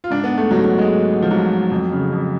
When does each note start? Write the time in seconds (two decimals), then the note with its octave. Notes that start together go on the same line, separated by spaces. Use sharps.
0.04 F4
0.10 G#2 D4
0.24 B3
0.38 A3
0.51 G#2 F#3
0.64 F#3
0.78 G#3
0.91 G#2
1.22 F3
1.31 G#2 F#3
1.71 F2
1.92 C#3
2.12 F2